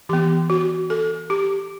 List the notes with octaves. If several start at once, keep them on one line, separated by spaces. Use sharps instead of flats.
E3 B3 G4
F#4
A4
G4